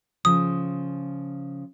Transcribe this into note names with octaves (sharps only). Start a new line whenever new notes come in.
C#3 F3 D#6